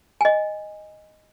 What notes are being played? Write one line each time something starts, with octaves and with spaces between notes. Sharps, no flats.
D#5 G#5